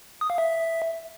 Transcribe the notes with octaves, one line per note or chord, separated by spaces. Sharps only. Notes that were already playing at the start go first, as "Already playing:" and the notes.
D#6
F5
E5